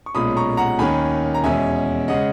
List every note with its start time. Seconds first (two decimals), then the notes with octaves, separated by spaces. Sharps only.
0.06 C#6
0.15 B1 A#2 G#3 C#4 B5 D#6
0.37 A#5 C#6
0.57 F#5 A#5
0.79 D#2 D#3 A#3 C#4 G#5 B5
1.34 A#5
1.44 E2 B2 G#3 C#4 E5 G#5
2.08 C#3 G#3 C#4 D#5 F#5